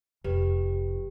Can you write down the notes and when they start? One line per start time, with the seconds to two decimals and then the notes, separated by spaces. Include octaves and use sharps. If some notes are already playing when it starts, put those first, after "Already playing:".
0.24 F1 G4 B4